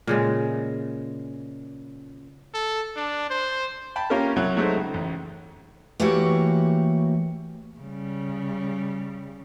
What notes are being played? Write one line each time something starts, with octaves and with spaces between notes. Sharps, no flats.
A#2 C#3 G#3
A4
D4
C5
G5 A5 B5
A#3 C#4 F4 G4 A#4
C2 F#3
F#3 G#3 A3 D#4 C5
C#2
A1
E3 A3 A#3 F#4 G4 C#5
C#3 G3